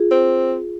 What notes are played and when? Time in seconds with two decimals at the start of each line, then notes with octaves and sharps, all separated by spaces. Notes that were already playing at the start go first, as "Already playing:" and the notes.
Already playing: F4 G#4
0.11 C4